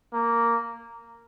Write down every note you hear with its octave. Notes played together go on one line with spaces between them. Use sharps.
A#3